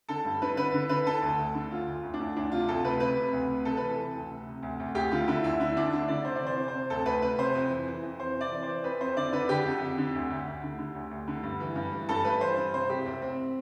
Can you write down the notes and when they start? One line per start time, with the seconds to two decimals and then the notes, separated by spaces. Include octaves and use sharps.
0.09 D3 A4
0.25 G2
0.42 D3 B4
0.57 D3 B4
0.74 D3
0.89 D3 B4
1.06 D3 A4
1.22 D2
1.39 D2
1.55 D3
1.71 D2 F4
1.87 D2
2.03 D2
2.14 D4
2.20 D2
2.36 D2 D4
2.52 C3 F4
2.68 D2 A4
2.84 C3 B4
3.00 C3 B4
3.17 C3
3.33 D2
3.49 C3
3.65 C3 A4
3.77 E3 B4
3.89 A4
3.98 E3
4.15 D2
4.30 C3
4.47 C3
4.62 D2
4.80 D2
4.95 D2 G4
5.12 D3 F4
5.28 D3 E4
5.44 D2 E4
5.60 D3 E4
5.76 D2 D4
5.93 D3 E4
6.08 D3 D5
6.25 C3 C5
6.36 D5
6.42 E3 C5
6.57 C3
6.68 C5
6.73 C3
6.90 D2 A4
7.05 D2 B4
7.22 C3 B4
7.38 C3 C5
7.55 F2
7.70 E3
7.87 E3
8.03 F2
8.19 E3 C5
8.36 C3 D5
8.52 E3
8.63 E3 C5
8.84 F2 B4
9.01 F2 C5
9.17 D3 D5
9.32 D3 B4
9.49 D3 G4
9.65 F2
9.81 F2
9.98 D3
10.15 D2
10.30 D2
10.47 D2
10.63 D3
10.78 D3
10.94 D2
11.11 D2
11.28 D3
11.43 G2
11.60 E3
11.76 G2
11.93 E3
12.09 G2 A4
12.24 G2 B4
12.41 E3 C5
12.57 G2
12.74 C3 C5
12.90 C2 G4
13.05 C2 C4
13.22 C2 C4